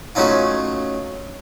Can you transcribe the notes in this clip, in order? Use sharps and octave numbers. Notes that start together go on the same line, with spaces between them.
F#3 A3 C#4 D#4 F4